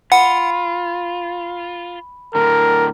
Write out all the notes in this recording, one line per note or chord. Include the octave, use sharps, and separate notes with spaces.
F4 F#5 B5
A2 D3 A#4